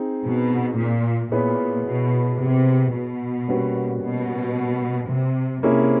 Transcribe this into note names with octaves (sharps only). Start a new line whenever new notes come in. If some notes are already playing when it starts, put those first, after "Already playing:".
Already playing: C4 D#4 G#4
B2
A#2
A#2 B3 E4 G#4 C#5
B2
C3
B2
G3 A#3 C#4 F#4 B4
B2
C3
C3 A#3 C#4 E4 G#4